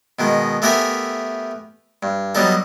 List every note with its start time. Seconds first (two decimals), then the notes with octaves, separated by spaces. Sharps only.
0.19 B2 D#3 G#3
0.62 A3 B3 G4 A#4 E5 G#5
2.03 G2
2.35 F#3 G3 B3 D#4 A4